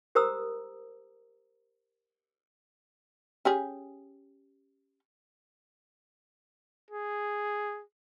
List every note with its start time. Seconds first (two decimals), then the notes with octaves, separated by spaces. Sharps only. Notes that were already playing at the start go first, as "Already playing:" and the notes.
0.15 G4 A#4 C5 A#5 D#6 E6
3.45 C#4 G4 G#4
6.91 G#4